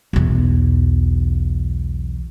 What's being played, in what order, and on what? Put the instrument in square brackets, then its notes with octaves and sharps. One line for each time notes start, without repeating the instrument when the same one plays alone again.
[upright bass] B1 E2